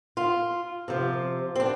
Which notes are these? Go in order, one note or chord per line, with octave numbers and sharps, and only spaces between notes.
F4
C3 F3
C4
D4